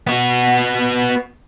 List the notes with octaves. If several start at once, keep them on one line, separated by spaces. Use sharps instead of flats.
B3 F#4